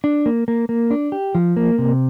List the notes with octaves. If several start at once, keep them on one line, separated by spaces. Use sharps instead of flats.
D4
A#3
A#3
A#3
D4
G4
F3
A#3
C3